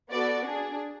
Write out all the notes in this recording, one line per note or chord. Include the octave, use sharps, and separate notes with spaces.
B3 F#4 A4 D5
D4 G#4